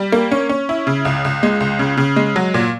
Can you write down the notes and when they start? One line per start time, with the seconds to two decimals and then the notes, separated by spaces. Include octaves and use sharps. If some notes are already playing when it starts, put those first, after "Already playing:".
Already playing: G3
0.12 A#3
0.31 C#4
0.49 C#4
0.69 E4
0.87 C#3
1.05 C#2
1.25 C#2
1.43 G#3
1.60 C#2
1.79 C#3
1.97 C#3
2.16 G#3
2.36 F#3
2.54 A#2